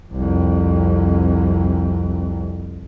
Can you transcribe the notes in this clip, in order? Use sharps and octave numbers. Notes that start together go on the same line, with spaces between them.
C2 F2